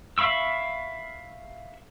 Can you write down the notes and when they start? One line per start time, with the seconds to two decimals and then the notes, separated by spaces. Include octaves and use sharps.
0.18 E5 F5 B5 C#6 E6